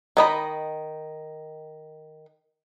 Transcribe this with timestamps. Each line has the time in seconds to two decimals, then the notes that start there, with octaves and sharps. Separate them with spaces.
0.17 D#3 D#5 B5